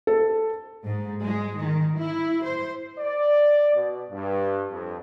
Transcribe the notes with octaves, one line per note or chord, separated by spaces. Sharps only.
A4
G#2
G#3
D#3
E4
C5
D5
B2
G2
F2